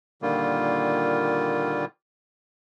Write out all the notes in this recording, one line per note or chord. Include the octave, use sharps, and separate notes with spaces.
A#2 D3 D#3 G3 A#3 F4